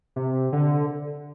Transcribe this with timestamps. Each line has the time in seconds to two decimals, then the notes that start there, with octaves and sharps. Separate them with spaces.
0.16 C3
0.53 D3